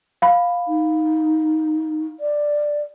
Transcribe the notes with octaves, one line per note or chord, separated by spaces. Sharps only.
F5 B5
D#4
D5